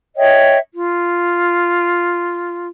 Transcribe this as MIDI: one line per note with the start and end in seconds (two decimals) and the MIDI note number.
0.16 0.58 73
0.16 0.58 75
0.16 0.58 76
0.16 0.58 79
0.73 2.68 65